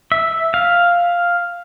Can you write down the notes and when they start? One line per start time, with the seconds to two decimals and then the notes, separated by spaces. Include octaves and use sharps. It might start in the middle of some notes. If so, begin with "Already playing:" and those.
0.12 E5
0.54 F5